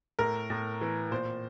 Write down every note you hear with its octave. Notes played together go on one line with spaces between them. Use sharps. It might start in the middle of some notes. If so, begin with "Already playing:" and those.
A2 A#4
A2
E3
A#2 C5